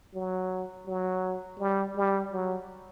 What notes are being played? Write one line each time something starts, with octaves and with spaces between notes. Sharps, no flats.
F#3
F#3
G3
G3
F#3